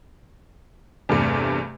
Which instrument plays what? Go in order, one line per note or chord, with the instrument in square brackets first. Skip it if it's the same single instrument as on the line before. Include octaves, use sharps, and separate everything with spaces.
[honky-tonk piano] E2 G2 C3 A3